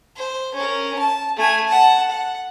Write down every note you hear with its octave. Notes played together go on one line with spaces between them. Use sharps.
C5
C#4 A#4
A5
A3 G#5
F#5 A5
F#5